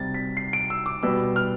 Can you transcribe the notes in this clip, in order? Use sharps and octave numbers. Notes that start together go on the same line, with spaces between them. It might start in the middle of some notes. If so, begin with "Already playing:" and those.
Already playing: C3 G3 A6
B6
C7
D7
E6
D6
B2 G3 E6
F6